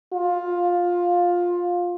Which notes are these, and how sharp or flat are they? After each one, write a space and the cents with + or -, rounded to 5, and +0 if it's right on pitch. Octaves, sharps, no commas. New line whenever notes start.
F4 +15